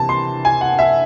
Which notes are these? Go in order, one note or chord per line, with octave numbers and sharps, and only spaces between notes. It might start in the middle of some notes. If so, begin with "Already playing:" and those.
Already playing: C3 E3 A5
C6
G#5
F#5
E5